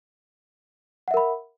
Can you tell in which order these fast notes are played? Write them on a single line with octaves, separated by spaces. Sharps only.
F#5 E5 A#4 B5